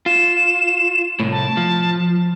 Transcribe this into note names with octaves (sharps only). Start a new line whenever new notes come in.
F4 E7
C2 A2
A5
F3